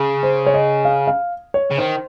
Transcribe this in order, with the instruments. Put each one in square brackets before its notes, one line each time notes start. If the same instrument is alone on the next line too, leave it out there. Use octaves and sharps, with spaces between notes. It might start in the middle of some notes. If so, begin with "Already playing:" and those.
Already playing: [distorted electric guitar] C#3
[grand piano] C5
C#5
D#5
F5
F5
C#5
[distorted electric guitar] C#3
[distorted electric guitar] D#3 [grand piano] C5